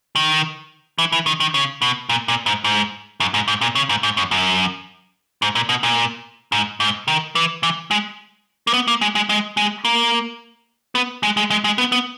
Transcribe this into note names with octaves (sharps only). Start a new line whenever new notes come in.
D#3
E3
E3
D#3
D#3
C#3
B2
A#2
A#2
G#2
G#2
F#2
G#2
G#2
A#2
C#3
G#2
G#2
F#2
F#2
G#2
A#2
B2
A#2
G#2
G#2
D#3
E3
E3
G#3
A#3
B3
A#3
G#3
G#3
G#3
G#3
A#3
B3
G#3
G#3
G#3
G#3
B3
B3